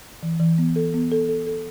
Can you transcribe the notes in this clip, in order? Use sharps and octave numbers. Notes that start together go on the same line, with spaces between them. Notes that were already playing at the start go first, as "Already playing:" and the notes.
E3
E3
B3
A4
B3
A4
A4
A4